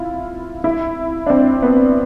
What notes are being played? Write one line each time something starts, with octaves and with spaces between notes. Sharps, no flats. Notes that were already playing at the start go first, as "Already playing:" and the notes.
Already playing: E4 F4
E4
D4
C4
B3